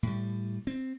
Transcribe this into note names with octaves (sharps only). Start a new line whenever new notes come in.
A2 G3
C4